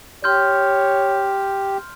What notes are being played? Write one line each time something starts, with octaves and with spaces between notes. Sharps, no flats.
G4 C#5 C6 F6 G6